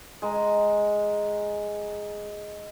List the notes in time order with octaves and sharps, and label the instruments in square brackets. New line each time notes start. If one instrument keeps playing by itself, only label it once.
[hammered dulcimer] G#3 A#5